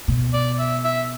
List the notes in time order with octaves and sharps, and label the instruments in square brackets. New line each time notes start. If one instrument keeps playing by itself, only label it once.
[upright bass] B2
[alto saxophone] D5
E5
E5